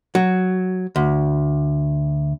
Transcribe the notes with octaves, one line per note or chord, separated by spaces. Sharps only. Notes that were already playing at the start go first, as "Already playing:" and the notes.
F#3
D2